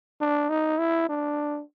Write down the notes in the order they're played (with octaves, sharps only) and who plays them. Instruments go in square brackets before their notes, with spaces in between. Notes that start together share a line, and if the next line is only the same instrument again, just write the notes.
[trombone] D4
D#4
E4
D4